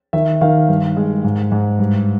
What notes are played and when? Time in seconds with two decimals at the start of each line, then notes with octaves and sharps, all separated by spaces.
0.13 D#3 E5
0.41 D#3 F5
0.69 G2
0.97 G#3
1.24 G#2
1.52 G#2
1.79 G2